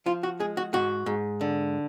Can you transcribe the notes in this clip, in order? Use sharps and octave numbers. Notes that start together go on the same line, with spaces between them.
F3 F4
F#4
G#3 G#4
F#4
G#2 F#4
G#2
D3